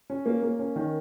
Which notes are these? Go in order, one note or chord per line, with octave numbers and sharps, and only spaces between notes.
C#4
A#3
A#3
C#4
D#3